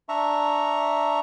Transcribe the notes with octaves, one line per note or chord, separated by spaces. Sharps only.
D4 E5 A#5 C#6